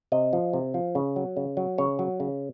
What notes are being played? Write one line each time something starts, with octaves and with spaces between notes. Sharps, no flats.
C3 D#5
F3
C3
F3
C#3
F#3
C#3
F#3
C#3 C#5
F#3
C#3